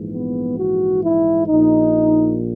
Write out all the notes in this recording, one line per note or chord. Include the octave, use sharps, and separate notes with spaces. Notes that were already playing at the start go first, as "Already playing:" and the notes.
Already playing: A#1 G#2 E3
B3
F#4
E4
A#1 A#2 D#4